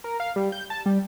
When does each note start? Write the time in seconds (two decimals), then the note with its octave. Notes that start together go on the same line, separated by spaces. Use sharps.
0.04 A#4
0.20 F5
0.36 G3
0.52 G6
0.70 A5
0.86 G3